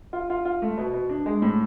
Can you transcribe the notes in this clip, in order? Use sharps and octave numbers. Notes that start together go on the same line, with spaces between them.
F4
F4
F4
A3
B2
B2
D4
G#3
A2